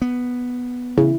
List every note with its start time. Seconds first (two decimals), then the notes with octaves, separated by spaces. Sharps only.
0.02 B3
0.98 C#3 E4